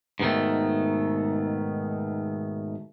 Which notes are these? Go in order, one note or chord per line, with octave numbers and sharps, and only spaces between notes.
G#2 B2 D#3 A3